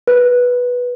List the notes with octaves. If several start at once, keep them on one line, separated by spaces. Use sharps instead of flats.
B4